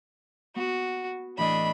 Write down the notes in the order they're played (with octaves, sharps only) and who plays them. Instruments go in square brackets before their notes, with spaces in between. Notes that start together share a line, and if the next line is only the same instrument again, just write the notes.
[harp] B3 [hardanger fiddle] F#4
[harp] A2 E3 D#5 [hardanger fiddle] D4 B5